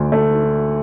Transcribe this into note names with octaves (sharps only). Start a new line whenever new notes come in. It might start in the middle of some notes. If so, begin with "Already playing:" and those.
Already playing: D2 D3
A3